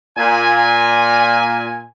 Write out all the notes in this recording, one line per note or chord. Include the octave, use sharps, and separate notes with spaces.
A#2 G#5